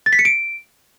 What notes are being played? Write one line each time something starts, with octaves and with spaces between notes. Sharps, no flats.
A6
B6
C#7
D7